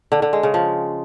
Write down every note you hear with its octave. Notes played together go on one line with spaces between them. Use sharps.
D3
D3
G#3
C#3
F3